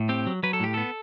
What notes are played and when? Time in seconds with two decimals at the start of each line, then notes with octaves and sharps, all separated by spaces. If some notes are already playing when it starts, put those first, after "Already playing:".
Already playing: A2
0.09 C4 G4
0.27 F#3
0.43 F#3 B4
0.53 A4
0.60 A2 G4
0.74 B3 A4